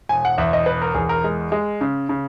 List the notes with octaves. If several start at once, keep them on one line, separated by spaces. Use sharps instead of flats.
E1 G#5
F#5
E2 E5
D#5
E1 B4
A#4
E2 G#4
A#4
G#3
G#3
C#3
C#3